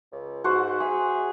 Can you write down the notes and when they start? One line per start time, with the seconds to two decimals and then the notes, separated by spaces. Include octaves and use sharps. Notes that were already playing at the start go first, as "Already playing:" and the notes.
0.12 C#2
0.44 G#2 F#4 C5 F#5
0.80 G#4 E5